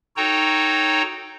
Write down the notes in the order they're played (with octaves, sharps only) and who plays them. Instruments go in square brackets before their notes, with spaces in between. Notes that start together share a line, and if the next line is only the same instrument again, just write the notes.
[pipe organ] D#4 F#4 A4 C#5 G5 A#5